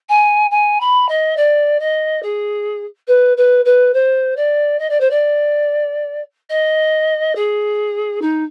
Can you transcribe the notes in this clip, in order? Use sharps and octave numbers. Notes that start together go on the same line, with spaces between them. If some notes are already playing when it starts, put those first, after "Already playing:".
G#5
G#5
B5
D#5
D5
D#5
G#4
B4
B4
B4
C5
D5
D#5
D5
C5
D5
D#5
G#4
D#4